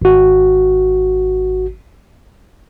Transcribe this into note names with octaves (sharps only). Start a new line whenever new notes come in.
G#1 F#4